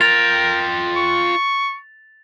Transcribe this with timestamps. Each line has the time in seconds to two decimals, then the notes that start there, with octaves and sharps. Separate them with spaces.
0.01 F4 A#4 G5 A6 F7
0.96 C#6